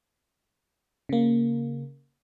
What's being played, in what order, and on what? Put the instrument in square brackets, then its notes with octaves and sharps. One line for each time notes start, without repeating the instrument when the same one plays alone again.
[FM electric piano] C#3 A#3